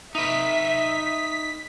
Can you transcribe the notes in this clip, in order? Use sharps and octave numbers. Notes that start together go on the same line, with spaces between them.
D#4 B4 E5 B6